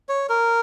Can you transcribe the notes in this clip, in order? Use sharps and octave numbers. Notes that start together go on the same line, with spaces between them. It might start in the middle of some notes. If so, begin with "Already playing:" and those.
C#5
A#4